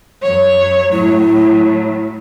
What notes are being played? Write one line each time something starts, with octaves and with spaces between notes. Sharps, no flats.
F#2 C#5
A2 F#3 E4